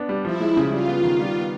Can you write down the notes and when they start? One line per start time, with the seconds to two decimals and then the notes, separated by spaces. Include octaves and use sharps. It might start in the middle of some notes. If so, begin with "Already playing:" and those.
Already playing: B3 D4
0.09 G3
0.25 F3 E4
0.40 G#3
0.57 C#3
0.72 G3 F4
0.88 B3
1.03 D#3
1.20 G3
1.36 B3